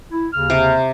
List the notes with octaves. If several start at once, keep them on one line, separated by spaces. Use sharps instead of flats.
E4
D#2 C#3 F6
C3